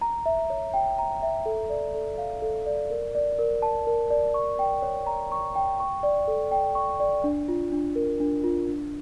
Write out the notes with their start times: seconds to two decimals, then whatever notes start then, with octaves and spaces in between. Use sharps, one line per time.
0.01 A#5
0.26 E5
0.50 C#5
0.74 G5
0.99 A#5
1.22 E5
1.46 A4
1.70 D5
1.94 A4
2.18 F5
2.42 A4
2.66 D5
2.90 A#4
3.15 D5
3.39 A#4
3.62 A5
3.87 A#4
4.10 D5
4.34 C#6
4.59 G5
4.82 C#5
5.07 A#5
5.32 C#6
5.56 G5
5.80 C#6
6.03 D5
6.28 A4
6.51 G5
6.75 C#6
7.00 D5
7.24 D4
7.48 F4
7.72 D4
7.96 A#4
8.20 D4
8.44 F4
8.69 D4